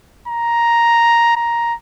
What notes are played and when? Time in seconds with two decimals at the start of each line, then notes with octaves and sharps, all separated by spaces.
0.28 A#5
1.36 A#5